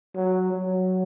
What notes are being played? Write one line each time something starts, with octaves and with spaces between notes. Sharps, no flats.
F#3
F#3